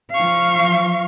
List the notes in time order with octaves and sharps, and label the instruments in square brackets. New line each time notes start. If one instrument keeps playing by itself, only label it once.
[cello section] F3 F5 [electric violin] C#6